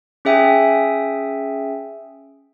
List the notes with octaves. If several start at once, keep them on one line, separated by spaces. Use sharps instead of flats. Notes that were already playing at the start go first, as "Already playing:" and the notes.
C#4 G#4 E5 G5 G#5